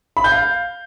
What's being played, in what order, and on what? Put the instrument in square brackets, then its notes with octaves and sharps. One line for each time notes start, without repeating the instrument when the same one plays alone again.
[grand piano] B5
G6
F5